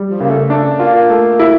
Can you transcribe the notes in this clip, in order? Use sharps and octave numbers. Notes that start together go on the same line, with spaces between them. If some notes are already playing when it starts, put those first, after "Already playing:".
Already playing: G3
F3
C#3 A#3
A3
A3 D4
A#3 F4
A#3
A3
E4